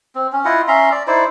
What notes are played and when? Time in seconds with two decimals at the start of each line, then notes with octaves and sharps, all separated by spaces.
0.15 C4
0.33 C#4
0.45 E4 F4 D#5 F#5
0.68 C#4 E5 A#5 C6
0.92 D5
1.07 D#4 E4 C5 D5